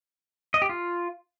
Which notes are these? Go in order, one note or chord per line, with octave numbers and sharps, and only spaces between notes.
D#5
G4
F4